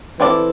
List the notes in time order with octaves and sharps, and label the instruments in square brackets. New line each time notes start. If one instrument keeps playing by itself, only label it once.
[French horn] E3 [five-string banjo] C4 E4 A4 D5